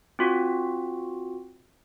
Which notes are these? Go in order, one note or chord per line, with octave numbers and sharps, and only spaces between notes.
C4 F4 F#4